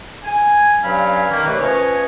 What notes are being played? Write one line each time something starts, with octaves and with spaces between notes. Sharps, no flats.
G#5
G2 F#3 C#4 F5 G#5 B5
D#3 A#3
D#2 C3 A3 B4 D5 C#6
F3 C#4 B4 C#5 D#5